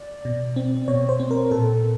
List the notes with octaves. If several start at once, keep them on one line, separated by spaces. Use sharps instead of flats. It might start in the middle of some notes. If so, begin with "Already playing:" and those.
Already playing: D5
B2
C4
B2 C#5
C5
C4
A#4
A#2 A4